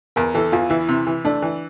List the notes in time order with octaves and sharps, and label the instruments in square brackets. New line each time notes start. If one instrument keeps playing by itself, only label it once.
[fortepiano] E2 [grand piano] A#4
[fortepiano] E3 [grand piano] A4
[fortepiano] E2 [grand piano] F4
[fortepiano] E3 [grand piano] E4
[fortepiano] C3
E3
[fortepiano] A3 [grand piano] D4
[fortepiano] E3